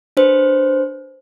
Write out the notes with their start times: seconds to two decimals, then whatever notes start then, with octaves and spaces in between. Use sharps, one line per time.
0.17 D4 B4 C5